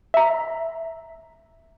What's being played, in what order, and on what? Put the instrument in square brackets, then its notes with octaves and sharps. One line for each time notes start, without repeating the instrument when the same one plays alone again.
[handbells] E5 A#5